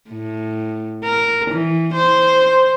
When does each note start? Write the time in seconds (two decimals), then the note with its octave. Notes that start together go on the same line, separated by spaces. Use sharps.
0.10 A2
1.04 A#4
1.50 E3
1.93 C5